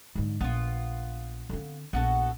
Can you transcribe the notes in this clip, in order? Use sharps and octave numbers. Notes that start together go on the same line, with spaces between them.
G#2 D3
A#1 B3 F4
D3 C4
A#1 B3 F#4 A4